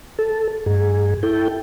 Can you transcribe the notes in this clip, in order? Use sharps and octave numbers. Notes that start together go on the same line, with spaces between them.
A4
G2 G#4
E4 A4 G5